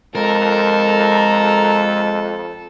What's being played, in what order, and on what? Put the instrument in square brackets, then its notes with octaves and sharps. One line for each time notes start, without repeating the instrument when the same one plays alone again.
[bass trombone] F2 [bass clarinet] G#3 [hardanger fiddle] A4 [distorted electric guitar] A#4